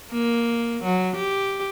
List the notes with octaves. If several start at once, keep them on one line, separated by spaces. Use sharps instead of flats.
A#3
F#3
G4